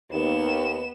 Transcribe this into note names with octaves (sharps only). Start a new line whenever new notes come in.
D#2 B3 E7